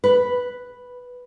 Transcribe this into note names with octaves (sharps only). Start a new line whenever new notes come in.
B4